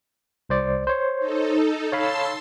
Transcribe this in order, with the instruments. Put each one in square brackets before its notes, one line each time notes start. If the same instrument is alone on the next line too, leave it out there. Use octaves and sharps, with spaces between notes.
[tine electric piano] C2 C5 D5
C5 C#5
[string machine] D#4 A4
[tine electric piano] C#5 F5 B5 [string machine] A5 C6 E6